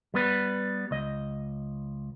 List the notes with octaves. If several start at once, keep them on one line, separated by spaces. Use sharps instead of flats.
G3 B3 B4
C#2 D#5